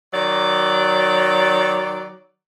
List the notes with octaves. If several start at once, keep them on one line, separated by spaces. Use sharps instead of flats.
D#3 F#3 D5